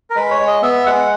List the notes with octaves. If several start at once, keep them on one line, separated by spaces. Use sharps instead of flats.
A#4
G#3 B4
C#5
G#3
D#5
B3 E5
G#3 F#5